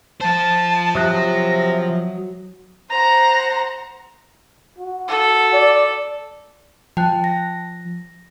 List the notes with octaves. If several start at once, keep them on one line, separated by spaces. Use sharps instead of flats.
F3 C5 A5
C3 F#3 D#6 F#6 A#6
C5 F#5 A#5
F#4
A4
D5
F3 G5 A5 F#6
A#6